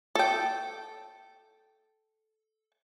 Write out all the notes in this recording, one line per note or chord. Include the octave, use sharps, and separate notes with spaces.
A4 G5